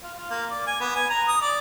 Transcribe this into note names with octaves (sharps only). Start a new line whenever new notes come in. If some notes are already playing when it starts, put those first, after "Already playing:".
F4
F4
A#3
D5
G#5
B3
G#5
A#5
D#6
D5